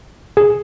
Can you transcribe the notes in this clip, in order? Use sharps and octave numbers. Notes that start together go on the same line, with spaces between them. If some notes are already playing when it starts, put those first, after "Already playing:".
G#4